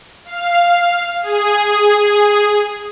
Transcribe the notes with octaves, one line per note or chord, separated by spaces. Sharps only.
F5
G#4